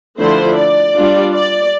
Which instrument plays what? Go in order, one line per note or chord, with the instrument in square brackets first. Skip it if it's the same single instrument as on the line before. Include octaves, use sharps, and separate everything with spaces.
[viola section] D3 F3 A3 E4 C5
D5
G3 D4 F4
D5